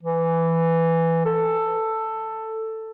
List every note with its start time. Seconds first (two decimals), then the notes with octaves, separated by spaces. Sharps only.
0.03 E3
1.25 A4